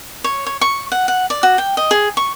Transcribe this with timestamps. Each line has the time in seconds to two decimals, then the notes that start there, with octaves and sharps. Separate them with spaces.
0.24 C#5
0.47 C#5
0.61 C#6
0.92 F#5
1.08 F#5
1.30 D5
1.43 F#4
1.58 G5
1.77 D#5
1.91 G#4
2.17 C#6